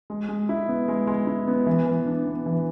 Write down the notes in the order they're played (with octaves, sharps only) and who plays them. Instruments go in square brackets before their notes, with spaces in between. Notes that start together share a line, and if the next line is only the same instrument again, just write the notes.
[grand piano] G#3
G#3
E4
B3
G#3
G#3
E4
B3
E3
E3
D4
B3
E3